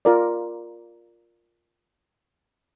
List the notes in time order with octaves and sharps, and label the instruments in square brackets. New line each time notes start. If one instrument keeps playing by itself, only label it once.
[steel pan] F4 A#4 D5